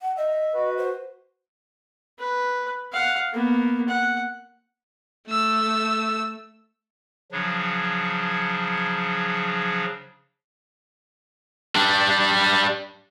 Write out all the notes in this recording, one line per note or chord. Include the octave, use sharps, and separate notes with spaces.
F#5
D#5 E5
F#4 B4
C5
B4
F5 F#5
A#3 B3
F#5
A3 E6
C#3 F3 F#3 D4
G3 D4